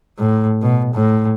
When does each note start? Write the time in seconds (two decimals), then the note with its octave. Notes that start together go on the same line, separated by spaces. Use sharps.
0.19 A2
0.62 B2
0.94 A2